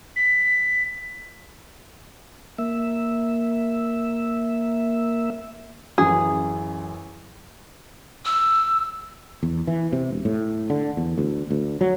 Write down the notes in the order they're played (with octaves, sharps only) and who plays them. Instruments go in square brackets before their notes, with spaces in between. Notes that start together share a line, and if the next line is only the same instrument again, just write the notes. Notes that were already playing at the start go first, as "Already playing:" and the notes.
[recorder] B6
[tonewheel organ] A#3 E5
[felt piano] A1 F#2 [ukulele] G#4
[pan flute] E6
[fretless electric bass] E2
E3
C3
E1
A2
D3
E2
D2
D2
F#3